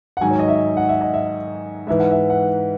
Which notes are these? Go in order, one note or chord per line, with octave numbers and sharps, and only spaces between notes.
F#5
G#2 D#3 F#3 G#5
C#5
D#5
E5
F#5
E5
D#5
E5
G#2 E3 E5
F#5
E5
F#5